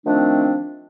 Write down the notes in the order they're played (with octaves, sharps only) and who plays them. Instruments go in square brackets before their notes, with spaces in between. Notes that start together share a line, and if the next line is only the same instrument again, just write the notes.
[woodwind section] D#3 F3 A3 C4 D4